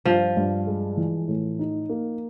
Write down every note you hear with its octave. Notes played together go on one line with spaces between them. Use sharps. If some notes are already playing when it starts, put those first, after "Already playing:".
G2 F3
G2
G#3
E3
A2
D#4
A#3